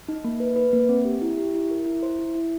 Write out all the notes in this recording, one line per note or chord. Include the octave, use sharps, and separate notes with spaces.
D#4
A#3
B4
B4
A#3
C4
G4
E4
G4
E4
A#4
E4
C5
E4
E4